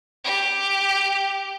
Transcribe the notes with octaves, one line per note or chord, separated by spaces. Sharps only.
G4